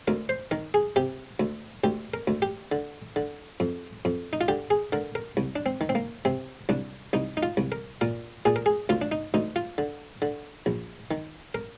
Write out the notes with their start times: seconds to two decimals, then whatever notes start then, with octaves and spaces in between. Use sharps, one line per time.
0.08 D2 A#4
0.29 C5
0.51 D#3 A#4
0.74 G#4
0.96 C3 G4
1.40 D2
1.84 D2 G4
2.14 A#4
2.27 D2
2.42 G4
2.72 D3
3.16 D3
3.60 F2
4.05 F2
4.33 D#4
4.41 F4
4.48 D3 G4
4.70 G#4
4.92 D3 A#4
5.15 A#4
5.37 C2
5.56 D4
5.66 C4
5.81 D#3
5.89 C4
5.95 A#3
6.25 C3 C4
6.69 C2 D4
7.13 C2 D#4
7.37 D#4
7.43 F4
7.57 C2
7.72 A#4
8.01 A#2 A#4
8.45 A#2 G#4
8.56 A#4
8.66 G#4
8.89 D2 F4
9.02 D4
9.12 D#4
9.34 D2 D#4
9.56 F4
9.78 D3
10.22 D3
10.66 A#1
11.11 D#3
11.55 A#4